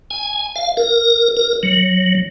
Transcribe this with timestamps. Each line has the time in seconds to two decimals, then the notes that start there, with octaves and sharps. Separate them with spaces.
0.11 G#5
0.56 F5
0.77 A#4
1.37 A#4
1.63 F#3